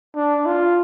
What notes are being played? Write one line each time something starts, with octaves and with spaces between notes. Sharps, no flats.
D4
F4